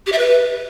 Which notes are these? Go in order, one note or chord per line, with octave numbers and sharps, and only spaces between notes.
G4
E5
B4